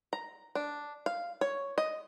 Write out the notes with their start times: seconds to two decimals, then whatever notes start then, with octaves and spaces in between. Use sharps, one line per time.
0.13 A#5
0.55 D4
1.06 F5
1.41 C#5
1.78 D#5